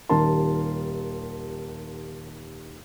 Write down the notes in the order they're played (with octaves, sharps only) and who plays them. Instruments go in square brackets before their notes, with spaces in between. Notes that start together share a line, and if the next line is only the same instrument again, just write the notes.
[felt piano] D#1 D#3 G4 A#4 A5 C6